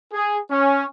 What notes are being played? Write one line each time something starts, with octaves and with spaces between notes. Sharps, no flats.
G#4
C#4